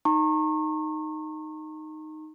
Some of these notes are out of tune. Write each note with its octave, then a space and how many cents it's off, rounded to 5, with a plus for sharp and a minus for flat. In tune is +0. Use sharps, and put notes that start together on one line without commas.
D#4 +0 A#5 -35 C#6 -35